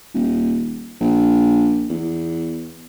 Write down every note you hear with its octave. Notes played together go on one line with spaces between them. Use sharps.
D#1
A#1
E2